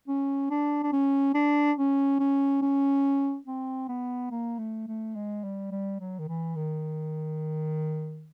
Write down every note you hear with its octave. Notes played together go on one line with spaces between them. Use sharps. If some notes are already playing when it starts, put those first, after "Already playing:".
C#4
D4
D4
C#4
D4
C#4
C#4
C#4
C4
B3
A#3
A3
A3
G#3
G3
G3
F#3
D#3
E3
D#3